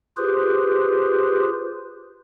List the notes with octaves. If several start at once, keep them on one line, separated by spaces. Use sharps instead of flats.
F4 G4 G#4 B4 C5